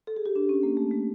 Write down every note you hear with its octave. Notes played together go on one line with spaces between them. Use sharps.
A4
G#4
G4
D4
C#4
A#3
A3
A3